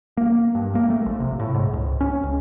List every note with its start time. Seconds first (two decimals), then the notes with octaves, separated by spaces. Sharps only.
0.17 A#3
0.55 G2
0.75 A#3
0.90 A3
1.06 A#1
1.20 C3
1.40 A2
1.54 G#2
1.73 C#2
2.01 C#4
2.23 C#2